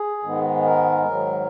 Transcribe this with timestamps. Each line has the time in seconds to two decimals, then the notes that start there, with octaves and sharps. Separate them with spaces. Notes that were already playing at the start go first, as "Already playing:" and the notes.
Already playing: G#4
0.23 G#2 D#3 G#3 B3
0.65 A#4
1.08 G#2 D#3 F#3